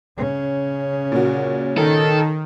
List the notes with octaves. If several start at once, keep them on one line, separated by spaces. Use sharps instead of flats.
C#3 C#4
A#2 F#4
D#3 A4